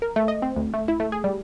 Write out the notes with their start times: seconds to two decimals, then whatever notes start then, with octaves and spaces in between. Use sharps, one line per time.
0.02 A#4
0.16 A3
0.28 D#5
0.42 C4
0.56 D2
0.74 A3
0.88 E4
1.00 A3
1.12 G#4
1.24 G3